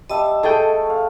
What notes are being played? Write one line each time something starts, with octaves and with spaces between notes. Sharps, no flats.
G3 D#5 E5 A5 D#6
A3 G#4 A4 G5
F5